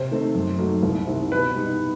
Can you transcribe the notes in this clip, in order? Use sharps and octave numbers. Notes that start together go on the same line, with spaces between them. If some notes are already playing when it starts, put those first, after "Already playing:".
Already playing: C3 C5
D#3 A3 C4 D#4
F#2
F#3 A3 D#4
C2
C3 D#3
B2 B4
G3 D#4